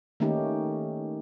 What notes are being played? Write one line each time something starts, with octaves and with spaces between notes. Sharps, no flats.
D#3 A3 A#3 C#4 D#4 G4